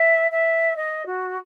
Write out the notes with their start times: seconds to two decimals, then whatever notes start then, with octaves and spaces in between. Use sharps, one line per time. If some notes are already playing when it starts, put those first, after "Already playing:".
Already playing: E5
0.31 E5
0.76 D#5
1.06 F#4